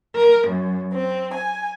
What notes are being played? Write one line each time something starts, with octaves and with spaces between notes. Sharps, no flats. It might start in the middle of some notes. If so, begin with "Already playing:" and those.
A#4
F#2
C4
G#5